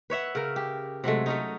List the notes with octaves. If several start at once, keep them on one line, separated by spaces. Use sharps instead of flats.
B4 C#5 E5 F#5
C#3 A#4
G4
C3 F#3 G#3 A3
A3 C#4 D#4